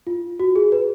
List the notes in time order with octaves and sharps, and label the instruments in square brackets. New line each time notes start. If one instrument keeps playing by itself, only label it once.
[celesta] F4
F#4
G#4
B4